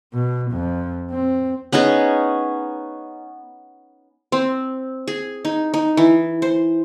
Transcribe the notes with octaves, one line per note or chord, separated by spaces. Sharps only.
B2
F2
C4
B3 C#4 D#4 G#4
C4
G#4
D#4
D#4
E3
C5